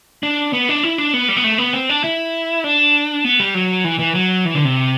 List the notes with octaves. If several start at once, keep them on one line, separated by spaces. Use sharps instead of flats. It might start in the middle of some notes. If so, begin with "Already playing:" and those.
D4
B3
D4
E4
D4
B3
G3
B3
A3
B3
C4
D4
E4
D4
B3
G3
F#3
E3
E3
F#3
E3
D3
C3